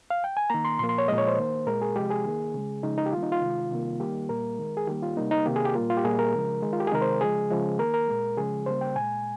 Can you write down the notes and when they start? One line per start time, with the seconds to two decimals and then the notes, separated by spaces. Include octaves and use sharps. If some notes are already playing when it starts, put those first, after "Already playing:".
0.10 F5
0.24 G5
0.37 G#5
0.50 D#3 A#3 A#5
0.65 C6
0.79 A#2 F3 A#3 C6
0.89 C6
0.98 C#5
1.08 A#2 F3 G#3 D#5
1.18 C#5
1.28 C5
1.38 D#3 A#3
1.66 A#2 G#3 A#4
1.82 G#4
1.96 C3 F3 G#3 G4
2.10 G#4
2.25 D#3 A#3
2.54 C#3 G#3
2.83 C#3 F3 G#3 D#4
2.98 D#4
3.06 G4
3.13 D#3 G3 A#3 F4
3.23 D#4
3.32 F4
3.42 C3 D#3 G#3
3.71 C3 D#3 G3 A#3
4.00 D#3 G3 A#3 G4
4.29 A#2 G3 A#3 A#4
4.58 D#3 G#3
4.77 G#4
4.87 D#3 G3 A#3 G4
5.02 F4
5.17 C3 G3 A#3 D#4
5.31 D#4
5.46 C3 D#3 A#3 G4
5.56 G#4
5.65 G4
5.75 A#2 G3 A#3 F4
5.90 F4
5.97 G4
6.04 A#2 G3 A#3 G#4
6.19 A#4
6.33 C#3 F3 G#3
6.62 D#3 G#3
6.73 F4
6.80 G4
6.87 G#4
6.92 C3 D#3 G#3 A#4
7.02 C5
7.21 C#3 F3 G#3 G#4
7.50 C#3 F3 G#3
7.79 D#3 A#3 A#4
7.94 A#4
8.08 A#2 G#3
8.37 C#3 F3 G#3 G#4
8.66 C#3 G3 A#3 C5
8.81 G5
8.96 A#2 G#3 G#5